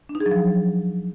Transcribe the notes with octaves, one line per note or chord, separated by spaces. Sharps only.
D4
D#4
G#4
F#3
F3